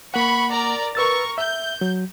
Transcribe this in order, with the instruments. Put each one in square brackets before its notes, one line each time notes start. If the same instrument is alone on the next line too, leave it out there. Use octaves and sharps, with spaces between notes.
[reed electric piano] A#3 F#5 [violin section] B5 C#6
[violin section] A#4 D5 A#5
[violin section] A#4 C#6 [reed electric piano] B4 E6 A6
[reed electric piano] E5 [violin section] G6
[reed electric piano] F#3